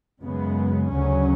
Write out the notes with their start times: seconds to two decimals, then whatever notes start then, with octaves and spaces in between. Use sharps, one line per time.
0.21 F#2 C#3 G#3 B3
0.91 D2 C#3 F#3 C#4